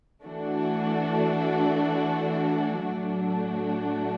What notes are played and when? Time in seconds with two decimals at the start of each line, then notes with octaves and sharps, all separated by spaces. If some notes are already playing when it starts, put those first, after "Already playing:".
0.24 E3 A3 D4 F#4
2.83 A2 F#3 A3 D4 F#4